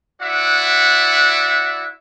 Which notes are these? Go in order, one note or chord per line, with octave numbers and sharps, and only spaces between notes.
E4 F#4 D5 E5 F#5